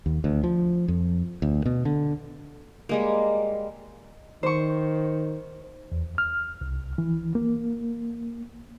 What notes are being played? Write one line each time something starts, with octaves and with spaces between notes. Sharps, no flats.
D#2
D2
F3
F2
D2
B2
D3
G3 G#3 A#3
D#3 C5 C#6
E2
F6
C2
E3
A#3